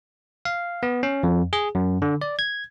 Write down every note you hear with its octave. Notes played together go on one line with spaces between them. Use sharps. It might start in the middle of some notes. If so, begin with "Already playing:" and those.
F5
B3
C#4
F2
G#4
F#2
D3
D5
G#6